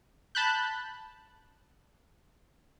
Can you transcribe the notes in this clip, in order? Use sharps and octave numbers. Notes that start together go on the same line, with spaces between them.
A5 B5 F#6 G6